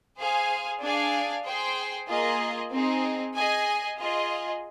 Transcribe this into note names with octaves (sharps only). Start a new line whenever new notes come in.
G#4 C5 F5 G#5
D4 G#4 D5 F5 G#5
G#4 C5 G5
A#3 F4 G#4 D#5
C4 D#4 G#4
G#4 D#5 G#5
F4 G#4 D#5